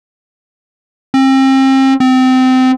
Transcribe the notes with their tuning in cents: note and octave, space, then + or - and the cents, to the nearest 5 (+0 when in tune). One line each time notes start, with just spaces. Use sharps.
C4 +35
C4 -25